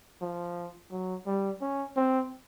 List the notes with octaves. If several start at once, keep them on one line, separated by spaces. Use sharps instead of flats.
F3
F#3
G3
C#4
C4